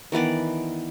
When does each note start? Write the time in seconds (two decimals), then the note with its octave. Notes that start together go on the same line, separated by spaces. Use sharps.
0.12 D#3 E3 B3 D5